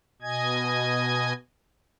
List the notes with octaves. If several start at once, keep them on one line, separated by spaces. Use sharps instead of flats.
B2 D#5 G#5 G#6